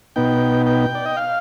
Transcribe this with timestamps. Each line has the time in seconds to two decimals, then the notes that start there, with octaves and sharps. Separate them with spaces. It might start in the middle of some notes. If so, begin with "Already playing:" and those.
0.16 B2 B3 D#4 G5
0.66 G5
0.95 D5
1.06 D#5
1.17 F5